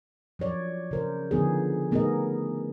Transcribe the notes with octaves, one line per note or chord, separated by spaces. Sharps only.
F3 F#3 C#5 D5
C#3 A#4 C5
D3 F3 B3 D#4 G#4
A3 B3 D#4 G#4 A#4 D#5